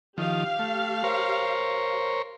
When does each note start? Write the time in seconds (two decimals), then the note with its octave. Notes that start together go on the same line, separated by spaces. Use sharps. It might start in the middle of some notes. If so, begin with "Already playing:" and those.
0.18 D#3 F3 G4 F5
0.59 A3
1.04 A#4 C5 C#5